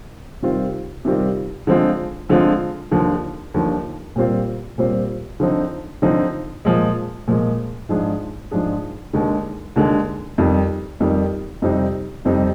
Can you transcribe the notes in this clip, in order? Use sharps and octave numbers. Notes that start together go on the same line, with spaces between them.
C3 D#3 G3 C4 F4
C3 D#3 G3 C4 F4
D3 F3 G#3 C4 F4
D3 F3 G#3 C4 F4
D#2 D3 F3
D#2 D3 F3
A#2 G3 C4 F4 C5
A#2 G3 C4 F4 C5
D3 F3 C4 D#4
D3 F3 C4 D#4
A#2 F3 G#3
A#2 F3 G#3
G#2 F3 G#3 D4 G#4
G#2 F3 G#3 D4 G#4
D#2 D3 G#3
D#2 D3 G#3
F2 D#3 G3
F2 D#3 G3
F2 C3 G3 C4 D#4
F2 C3 G3 C4 D#4